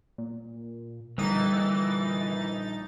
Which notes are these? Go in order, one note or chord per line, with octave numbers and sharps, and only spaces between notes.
A#2
A#1 D3 E3 G3 D#4 A6